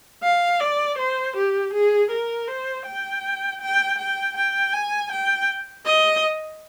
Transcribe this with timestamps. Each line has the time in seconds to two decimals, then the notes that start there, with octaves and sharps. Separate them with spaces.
0.23 F5
0.60 D5
0.98 C5
1.36 G4
1.73 G#4
2.11 A#4
2.48 C5
2.86 G5
3.61 G5
3.98 G5
4.36 G5
4.73 G#5
5.11 G5
5.86 D#5